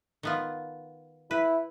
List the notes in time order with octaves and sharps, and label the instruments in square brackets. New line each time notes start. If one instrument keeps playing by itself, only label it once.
[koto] D#3 B3 F4
[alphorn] E4 [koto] B4